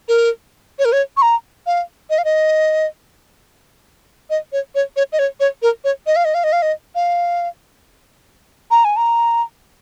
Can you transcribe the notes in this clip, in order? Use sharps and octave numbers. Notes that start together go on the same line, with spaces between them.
A#4
C#5
A#4
C#5
C#6
A#5
F5
D#5
F5
D#5
D#5
C#5
C#5
C#5
D#5
C#5
C#5
A#4
C#5
D#5
F5
D#5
F5
D#5
F5
D#5
F5
A#5
G#5
A#5